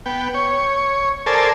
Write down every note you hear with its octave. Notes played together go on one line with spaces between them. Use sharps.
B3 G5
C#5
A4 A#4 C5 D5 G#5 A5